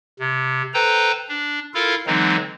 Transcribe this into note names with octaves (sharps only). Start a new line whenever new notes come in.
C3
A4 B4 C5 G5 A#5
D4
E4 F4 A4 A#4 F5
D3 E3 F#3 G#3 C4 D#4